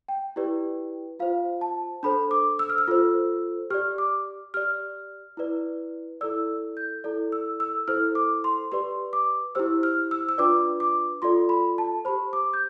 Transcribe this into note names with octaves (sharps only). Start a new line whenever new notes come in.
G5
E4 G4 B4 D5
F4 C5 F5
A5
D4 A4 C5 B5
D6
E6
F6
E6
F4 A4 C5
G4 D5 F6
D6
G4 D5 F6
E4 B4 D5
E4 A4 D5 E6
G6
E4 A4 D5
E6
E6
E4 A4 C5 F6
D6
C6
G4 B4 D5 C6
D6
E4 G4 C5 E6
F6
E6
E6
D4 F4 B4 D5 D6
D6
F4 A4 D5 C6
B5
A5
G4 C5 B5
D6
G6